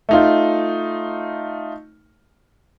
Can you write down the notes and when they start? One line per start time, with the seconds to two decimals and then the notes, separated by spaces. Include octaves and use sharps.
0.09 A3 D#4 F4